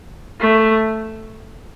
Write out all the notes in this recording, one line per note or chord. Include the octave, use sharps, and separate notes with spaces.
A3